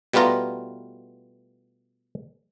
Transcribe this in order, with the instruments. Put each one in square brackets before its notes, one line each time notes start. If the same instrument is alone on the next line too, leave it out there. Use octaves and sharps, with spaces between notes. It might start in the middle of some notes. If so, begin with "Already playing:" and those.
[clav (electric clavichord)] B2 G3 A3 B3 F4 A#5